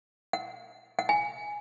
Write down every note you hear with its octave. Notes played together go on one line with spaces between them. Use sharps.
F#5
F#5
G#5